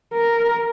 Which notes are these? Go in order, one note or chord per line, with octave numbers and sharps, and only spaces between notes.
A#4